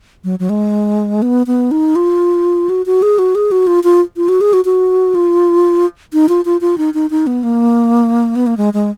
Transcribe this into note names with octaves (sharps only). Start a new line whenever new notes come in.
F#3
F#3
G#3
B3
B3
D#4
F4
F#4
F#4
G#4
F#4
G#4
F#4
F4
F4
F4
F#4
G#4
F#4
F#4
F4
D#4
F4
F4
F4
D#4
D#4
D#4
B3
A#3
B3
A#3
G#3
G#3